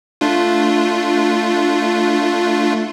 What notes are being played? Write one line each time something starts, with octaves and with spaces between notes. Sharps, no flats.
A3 D4 F4